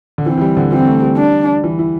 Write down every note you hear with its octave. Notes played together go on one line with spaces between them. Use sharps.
D3
E3 C4
E3
G3
D3
E3 C4
A3
G3
D4
E3
E4